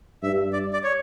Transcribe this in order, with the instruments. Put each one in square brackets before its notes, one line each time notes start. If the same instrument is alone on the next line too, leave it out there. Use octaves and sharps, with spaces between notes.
[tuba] G2 [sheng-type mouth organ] E5
[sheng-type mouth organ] D5
D5
C#5